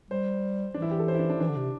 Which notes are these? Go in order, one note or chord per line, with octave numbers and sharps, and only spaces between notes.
G3 C5
E3 D4
E4
G4
A4
C5
E4
D4
D4
E3 D4
D3
C3